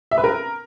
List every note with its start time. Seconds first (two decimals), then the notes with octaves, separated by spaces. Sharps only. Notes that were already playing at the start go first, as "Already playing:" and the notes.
0.11 E5
0.18 B4
0.24 A#4